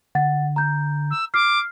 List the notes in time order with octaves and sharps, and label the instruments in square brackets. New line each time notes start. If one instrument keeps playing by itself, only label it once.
[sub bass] D3 [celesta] F#5 A6
[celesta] A#5 G6
[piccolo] E6
[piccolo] D6 [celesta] F6 C7